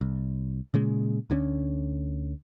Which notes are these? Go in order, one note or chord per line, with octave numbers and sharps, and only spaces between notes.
C2
A#2 C#3 G#3
D2 D3 E3 C#4